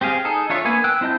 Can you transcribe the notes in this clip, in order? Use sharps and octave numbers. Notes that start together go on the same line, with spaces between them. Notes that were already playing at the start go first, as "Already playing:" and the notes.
C4 G4 G#4 F5
D#4 G#4 A4
D4 F4 C#5 E5
A#3 B3 B4 G#5
G5 E6 F#6
C4 E4 D#5 A5 G6